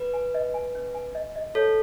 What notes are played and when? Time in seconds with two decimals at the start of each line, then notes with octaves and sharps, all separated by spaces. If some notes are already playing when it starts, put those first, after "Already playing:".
Already playing: B4
0.14 G#5
0.34 D#5
0.54 G#5
0.75 C#4
0.95 G#5
1.15 D#5
1.36 D#5
1.55 A4 C#5